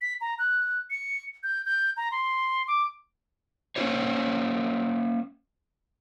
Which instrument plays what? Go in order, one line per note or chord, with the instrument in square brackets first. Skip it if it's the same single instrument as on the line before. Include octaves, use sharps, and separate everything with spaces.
[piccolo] B6
A#5
F#6
C#7
G6
G6
A#5
C6
D6
[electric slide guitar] A#3 C#4 D#4 F4 C5 C#5